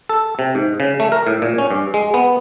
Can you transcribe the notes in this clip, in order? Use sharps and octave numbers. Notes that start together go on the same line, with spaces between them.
A4
C3
G#2
C#3
A3
A#4
A2
A#2
C#4
G2
G#3
B3